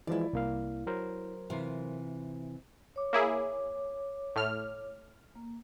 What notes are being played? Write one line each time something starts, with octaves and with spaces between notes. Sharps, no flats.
E3 F3 G#3 E4 D5
C2 A#3 F5
F#3 A#4 C5
C3 E3 F4
C#5 D6
A#3 E4 G#4
A2 F6
A#3